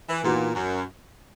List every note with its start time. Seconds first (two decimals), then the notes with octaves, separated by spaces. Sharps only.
0.09 E3
0.24 A#2 E3 B3 D#4 F#4
0.54 F#2